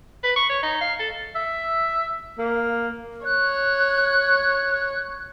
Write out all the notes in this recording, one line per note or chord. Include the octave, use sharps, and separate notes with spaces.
B4
C#6
C#5
D#4
F5
A4
E5
A#3
C#5 F#6